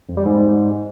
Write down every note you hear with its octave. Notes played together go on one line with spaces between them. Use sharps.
F2
G3
G#2